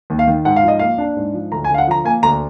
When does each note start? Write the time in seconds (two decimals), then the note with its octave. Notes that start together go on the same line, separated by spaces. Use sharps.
0.10 D#2
0.19 F5
0.27 D#3
0.45 G#2 F#5
0.56 F5
0.63 F3
0.68 D#5
0.79 A#3 F5
0.98 D4
1.16 G#2
1.34 F3
1.52 D2 A#5
1.64 G#5
1.70 D3 F5
1.78 F#5
1.87 F3 A#5
2.05 A#3 G#5
2.23 D2 A#5